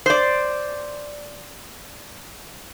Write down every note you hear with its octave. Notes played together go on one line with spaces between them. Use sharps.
C5 D5